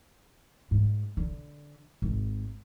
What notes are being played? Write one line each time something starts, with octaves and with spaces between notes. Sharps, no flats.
G#2
D3
G#1